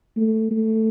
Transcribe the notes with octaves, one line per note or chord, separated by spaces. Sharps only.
A3
A3